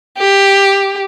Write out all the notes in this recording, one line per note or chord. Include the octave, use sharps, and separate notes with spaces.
G4